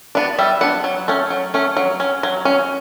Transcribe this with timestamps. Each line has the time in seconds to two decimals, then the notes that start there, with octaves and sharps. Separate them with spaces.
0.15 B3 D4
0.38 G3 E5
0.61 B3 D4 F#5
0.84 F#3
1.08 A3 C#4
1.30 F#3
1.54 A3 C#4
1.77 F#3
2.00 C#4
2.23 F#3
2.45 C#4